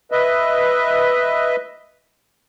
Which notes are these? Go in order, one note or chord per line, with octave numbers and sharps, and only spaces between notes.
B4 D#5 E5